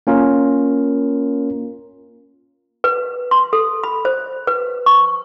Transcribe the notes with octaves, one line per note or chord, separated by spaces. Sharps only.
A#3 C#4 F4 A#4
B4
C6
A4
B5
C5
B4
C#6